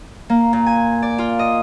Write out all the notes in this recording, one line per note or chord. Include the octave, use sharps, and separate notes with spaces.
A#3
A#2
G#5
D5
F4
D#5